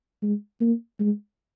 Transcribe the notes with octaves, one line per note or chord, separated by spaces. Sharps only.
G#3
A#3
G#3